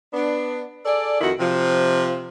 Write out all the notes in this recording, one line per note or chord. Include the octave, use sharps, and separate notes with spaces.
B3 D4
G#4 A4 D5
F2 D#3 E4 F#4
C3 F3